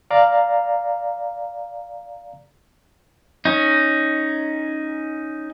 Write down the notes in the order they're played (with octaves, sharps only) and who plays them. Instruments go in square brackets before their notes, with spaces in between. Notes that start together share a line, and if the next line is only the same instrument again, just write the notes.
[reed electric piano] D5 F5 A#5
[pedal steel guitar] C#4 D#4